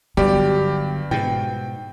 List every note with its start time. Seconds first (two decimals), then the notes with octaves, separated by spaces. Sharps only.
0.17 G1 G2 F#3 B3 G4 D5
1.11 G#2 B2 G5